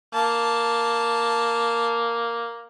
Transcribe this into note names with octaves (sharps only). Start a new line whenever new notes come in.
A#3 A5